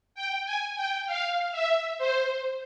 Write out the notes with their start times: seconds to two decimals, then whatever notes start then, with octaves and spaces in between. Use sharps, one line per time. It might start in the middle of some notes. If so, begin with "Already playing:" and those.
0.15 G5
0.45 G#5
0.76 G5
1.06 F5
1.51 E5
1.98 C5